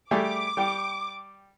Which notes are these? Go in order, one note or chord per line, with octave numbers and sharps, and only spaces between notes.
G3 A3 G#4 D6
G3 G5